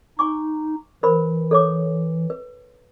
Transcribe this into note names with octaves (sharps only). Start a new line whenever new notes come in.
D#4 G#5 C#6 D6
E3 A#4 C5 B5
A4 C#5 D6
B4